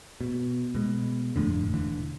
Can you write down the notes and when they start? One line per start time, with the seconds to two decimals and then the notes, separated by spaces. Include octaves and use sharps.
0.21 B2
0.75 B2 G#3
1.36 G1 F2 A2 D3
1.74 E1 D3 E3